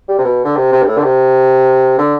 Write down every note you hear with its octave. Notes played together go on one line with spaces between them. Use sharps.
G3
C3
B2
D3
C3
C3
G2
A2
D3
C3
D3